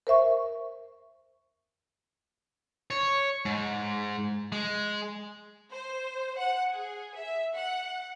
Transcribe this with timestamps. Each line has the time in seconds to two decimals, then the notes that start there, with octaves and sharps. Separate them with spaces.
0.07 A#4 C5 E5 C#6
2.91 C#5
3.45 G#2
4.52 G#3
5.71 C5
6.38 F#5
6.71 G#4
7.16 E5
7.55 F#5